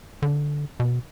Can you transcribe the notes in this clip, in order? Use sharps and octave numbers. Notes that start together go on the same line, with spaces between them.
D3
B2